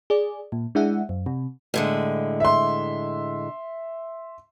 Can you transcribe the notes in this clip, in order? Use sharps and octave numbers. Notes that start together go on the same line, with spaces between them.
G#4 D5
A#2
G#3 D4 E4 G#4 E5 F#5
F#2
C3
A2 D3 G#3
E5 C6